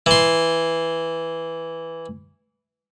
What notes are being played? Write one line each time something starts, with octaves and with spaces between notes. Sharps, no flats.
E3 C6